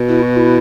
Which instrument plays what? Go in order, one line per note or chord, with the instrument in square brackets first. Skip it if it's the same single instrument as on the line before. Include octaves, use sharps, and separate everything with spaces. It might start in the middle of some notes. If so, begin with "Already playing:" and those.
Already playing: [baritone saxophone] B2
[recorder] E4
F#4
E4